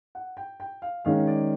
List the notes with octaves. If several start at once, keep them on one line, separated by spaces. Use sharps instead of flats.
F#5
G5
G5
F5
D#3 G#3 C#4 F5
D5